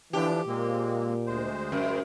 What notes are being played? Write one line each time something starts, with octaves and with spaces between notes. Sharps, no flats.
D3 E3 F3 D4 G4
A#2 G#3 A#3 C4
D2 G#3 C5
F#2